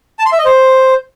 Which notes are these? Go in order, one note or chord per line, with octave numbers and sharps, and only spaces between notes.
A5
C6
E5
D#5
C5